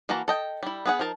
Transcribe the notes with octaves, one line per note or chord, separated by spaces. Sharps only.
E3 A#3 F#4 A5 A#5
A4 D#5 G5
G3 E4
B3 G#4 F#5
F3 D#4 A#4 A5